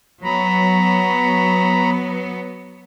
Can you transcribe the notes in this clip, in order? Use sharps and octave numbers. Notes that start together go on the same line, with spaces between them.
F#3 B3 A#5 B5